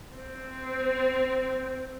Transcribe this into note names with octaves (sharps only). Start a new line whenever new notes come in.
C4